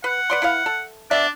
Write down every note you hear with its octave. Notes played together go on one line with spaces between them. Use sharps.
B4 F#5
B4 D5 C6
E4 B4 F5
A4
B3 D4 D5 E5